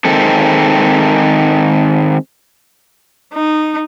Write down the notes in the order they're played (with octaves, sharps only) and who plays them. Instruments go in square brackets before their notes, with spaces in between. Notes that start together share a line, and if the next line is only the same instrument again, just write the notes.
[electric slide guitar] D#3 G#3 C4 A4
[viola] D#4